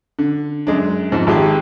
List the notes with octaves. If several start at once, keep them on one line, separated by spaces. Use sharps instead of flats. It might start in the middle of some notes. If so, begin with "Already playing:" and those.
D3
F#2 G#3 D4
F2 G#2
G#1 G4 G#4 A5